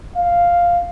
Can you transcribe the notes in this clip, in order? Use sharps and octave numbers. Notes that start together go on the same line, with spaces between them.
F5